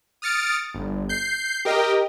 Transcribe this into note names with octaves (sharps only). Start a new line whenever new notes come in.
D#6 F6 A6 C#7 D7
G1
G6 C7
G4 A#4 D#5 G5